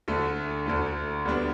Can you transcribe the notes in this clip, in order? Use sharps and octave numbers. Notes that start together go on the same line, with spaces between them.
D2 D3 A3
D2 D3 A3
D2 D3 G3 B3 D4